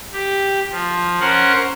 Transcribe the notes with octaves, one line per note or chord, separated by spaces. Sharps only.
G4
F3
C#4 A#4 C5 F#5